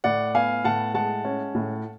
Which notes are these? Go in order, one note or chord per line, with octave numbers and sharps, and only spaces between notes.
A2 D5 F#5
B3 F5 G#5
A2 F#5 A5
G#3 F#5 A5
C#4
A2